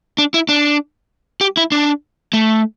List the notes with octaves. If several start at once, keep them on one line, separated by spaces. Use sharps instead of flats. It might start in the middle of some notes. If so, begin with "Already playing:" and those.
D4
E4
D4
G4
E4
D4
A3